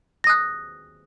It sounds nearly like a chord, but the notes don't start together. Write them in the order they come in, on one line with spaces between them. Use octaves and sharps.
A#6 D#6 F#6